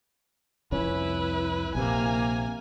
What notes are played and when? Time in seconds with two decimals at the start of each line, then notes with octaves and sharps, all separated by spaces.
0.72 C2 F2 C#4 E4 B4
1.75 A#1 C3 A#3 G#5